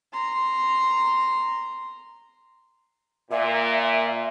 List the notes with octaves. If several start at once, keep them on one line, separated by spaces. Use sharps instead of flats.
A#5 C6
A#2 E5